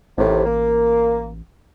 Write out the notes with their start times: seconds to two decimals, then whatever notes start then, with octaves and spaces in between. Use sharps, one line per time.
0.18 A1 D#2 A2 C3
0.45 A#3